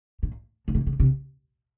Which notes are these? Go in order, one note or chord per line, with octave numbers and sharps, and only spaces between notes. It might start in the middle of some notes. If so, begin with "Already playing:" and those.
A#2
C#3
C3
C#3
C3